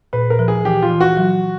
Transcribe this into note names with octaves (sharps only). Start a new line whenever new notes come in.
A#2 B4
A#4
F3
G#4
E3 G4
F4
E3
F#4
F#3